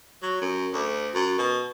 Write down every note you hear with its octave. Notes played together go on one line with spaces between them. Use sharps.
F#3
F#2
D2
F#2
B2